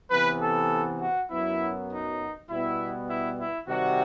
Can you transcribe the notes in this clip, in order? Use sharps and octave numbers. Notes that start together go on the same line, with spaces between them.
C3 E3 B3 B4
A4
F#4
F#2 F#3 B3 E4
D#4
B2 G3 B3 E4
E4
E4
C3 D#3 G3 F#4